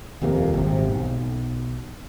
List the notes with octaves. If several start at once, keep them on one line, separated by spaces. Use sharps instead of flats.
D#1 F2 C3 A#3
G#1 C3
B1